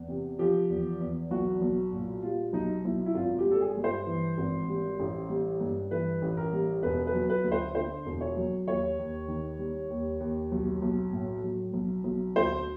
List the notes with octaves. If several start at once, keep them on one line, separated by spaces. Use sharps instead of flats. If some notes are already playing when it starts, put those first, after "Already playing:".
Already playing: E2
C3
F3 G4
E2
E2
B1 F#4
B1
A#2
G3 F4
B1 D#4
B1 E4
E4
G#1 F4
G4
G3
A4
G#4
G2
C5
E3
G#1
G3
A1
G3
G2
E3 B4
A1
A#4
G3
E1 B4
B4
F#3
B4
D2
C5
D3 C5
E1
C#5
F#3
D#2 C#5
D#2
D#3
G3
D#2
D#2
B1
B1
A2
F#3
B1
B1
D2 C5